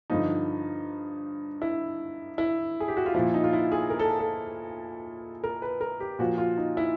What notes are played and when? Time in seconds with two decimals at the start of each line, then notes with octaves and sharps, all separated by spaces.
0.10 G2 D3 F3 D#4
1.62 E4
2.38 E4
2.80 G#4
2.88 G4
2.97 F#4
3.06 F4
3.14 A#2 F3 E4
3.34 D#4
3.44 F4
3.53 E4
3.72 G#4
3.90 A#4
3.99 A4
4.09 G#4
4.19 A4
5.44 A#4
5.62 B4
5.81 A#4
6.00 G4
6.19 A#2 F3 F#4
6.38 F4
6.58 D#4
6.77 E4